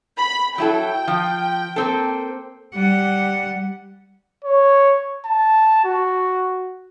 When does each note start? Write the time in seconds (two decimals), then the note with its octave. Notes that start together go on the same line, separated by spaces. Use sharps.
0.17 B5
0.58 F#3 E4 A4 G5
1.08 F3
1.76 A#3 C4 A4
2.75 G3 F#5
4.45 C#5
5.25 A5
5.85 F#4